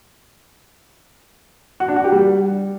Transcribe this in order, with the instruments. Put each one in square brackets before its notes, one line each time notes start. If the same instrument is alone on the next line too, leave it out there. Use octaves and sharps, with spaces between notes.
[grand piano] F#4
D4
F#4
G4
G3